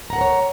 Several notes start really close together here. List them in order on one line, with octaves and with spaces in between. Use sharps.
A#5 F#5 A#4 C5 C#5